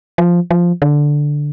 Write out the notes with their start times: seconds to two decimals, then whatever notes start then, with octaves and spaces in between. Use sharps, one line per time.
0.18 F3
0.51 F3
0.82 D3